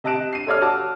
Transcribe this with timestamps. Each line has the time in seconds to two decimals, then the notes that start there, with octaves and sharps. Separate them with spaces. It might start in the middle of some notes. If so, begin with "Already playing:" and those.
0.04 C3 D#5 A5 F#6 D7 E7
0.33 C7 D#7
0.47 A4 C#5 D5 F6
0.62 F#4 A5 D6 E6